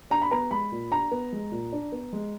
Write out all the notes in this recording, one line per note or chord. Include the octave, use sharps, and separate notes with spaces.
D4 A#5
B5
B3 A#5
G#3 B5
A#2
D4 A#5
B3
G#3
A#2
D4
B3
G#3